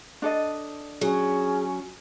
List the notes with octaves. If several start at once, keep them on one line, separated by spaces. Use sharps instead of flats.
D4 A4 D#5
F#3 C#4 G#4